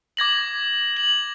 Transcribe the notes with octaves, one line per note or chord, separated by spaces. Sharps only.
D6 G#6 A#6 F#7
F#7